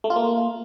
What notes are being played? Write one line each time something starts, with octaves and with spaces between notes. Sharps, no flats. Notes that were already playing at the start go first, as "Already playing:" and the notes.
A3
F4
A#3